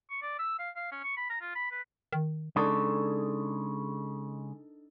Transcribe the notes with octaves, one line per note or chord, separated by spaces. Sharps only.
C#6
D5
E6
F5
F5
C#4
C#6
B5
A#5
F4
B5
B4
D#3
C#3 G#3 D4 D#4 A4